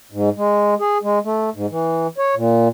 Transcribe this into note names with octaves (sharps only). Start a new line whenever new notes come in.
G#2
G#3
G#4
G#3
A3
G#2
E3
C#5
A#2